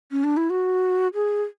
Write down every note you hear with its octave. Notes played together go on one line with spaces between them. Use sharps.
C#4
D4
E4
F#4
G#4